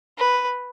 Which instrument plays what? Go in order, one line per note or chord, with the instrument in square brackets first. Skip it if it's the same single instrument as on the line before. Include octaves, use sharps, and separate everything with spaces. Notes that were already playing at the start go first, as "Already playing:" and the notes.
[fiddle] B4